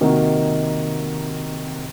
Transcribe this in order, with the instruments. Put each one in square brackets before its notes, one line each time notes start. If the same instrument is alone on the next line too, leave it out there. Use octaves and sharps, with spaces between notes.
[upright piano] C3 D#3 A#3 D#4 F#4